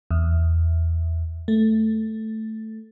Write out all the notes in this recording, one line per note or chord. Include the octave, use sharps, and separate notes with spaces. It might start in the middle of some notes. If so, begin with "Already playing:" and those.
E2
A3